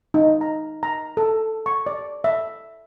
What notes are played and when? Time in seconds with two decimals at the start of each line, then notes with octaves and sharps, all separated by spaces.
0.14 D#4
0.41 A#5
0.83 A#5
1.17 A4
1.66 C#6
1.87 D5
2.24 E5